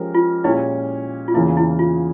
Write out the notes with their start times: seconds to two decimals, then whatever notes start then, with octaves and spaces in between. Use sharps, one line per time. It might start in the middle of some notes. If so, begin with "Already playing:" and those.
Already playing: F3 G#3 C#4 G4 A#4
0.14 F4
0.44 A#2 G#3 C#4 E4 G4 C#5
1.28 F4
1.34 E2 C#3 E3 A#3 E4
1.57 E4
1.79 F4